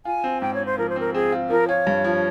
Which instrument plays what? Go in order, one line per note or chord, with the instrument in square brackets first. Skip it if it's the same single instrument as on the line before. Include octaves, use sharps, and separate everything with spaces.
[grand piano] F4 [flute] G#5
[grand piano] C4
[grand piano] G#2 [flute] G5
[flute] C#5
[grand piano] C4
[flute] C5
[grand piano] F3 [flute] A#4
[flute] C5
[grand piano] C4 [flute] A#4
[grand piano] C4 [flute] G#4
[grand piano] F4
[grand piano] F3 [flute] A#4
[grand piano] F4 [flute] C#5
[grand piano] G2
F3